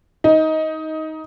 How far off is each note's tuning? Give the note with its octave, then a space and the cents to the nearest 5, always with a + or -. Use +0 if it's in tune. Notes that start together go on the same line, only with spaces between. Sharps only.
D#4 +15